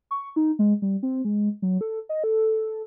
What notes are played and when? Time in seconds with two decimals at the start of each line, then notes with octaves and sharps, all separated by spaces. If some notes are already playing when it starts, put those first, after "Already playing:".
0.11 C#6
0.36 D#4
0.59 G#3
0.82 G3
1.03 C4
1.25 G#3
1.62 F#3
1.81 A4
2.09 D#5
2.24 A4